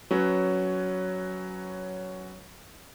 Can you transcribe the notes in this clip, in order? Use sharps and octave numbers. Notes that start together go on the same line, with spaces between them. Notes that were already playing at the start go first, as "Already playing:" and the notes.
F#3 C#4 B4